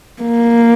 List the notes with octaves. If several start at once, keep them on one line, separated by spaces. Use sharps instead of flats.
A#3